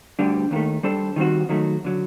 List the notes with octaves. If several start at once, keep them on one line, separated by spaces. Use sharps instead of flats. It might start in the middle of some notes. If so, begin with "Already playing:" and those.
D2 D3 G3 D4
D#2 D#3 A3
G3 D4 A4 C5
D#3 G3 C4 F#4
D#3 F#3 A3
D3 F#3